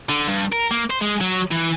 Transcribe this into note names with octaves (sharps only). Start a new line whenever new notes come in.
D3
G2
A#4
A#3
C5
G#3
F#3
E3